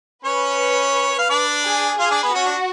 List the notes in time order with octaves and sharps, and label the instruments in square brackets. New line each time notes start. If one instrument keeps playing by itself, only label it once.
[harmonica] C#4 C#5 [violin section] B4
[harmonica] F5
D4 D5
[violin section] G#4
[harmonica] F4 F5 [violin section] G#4
[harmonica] D4 D5
B3 B4
[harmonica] C#4 C#5 [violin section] F#4
[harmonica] D4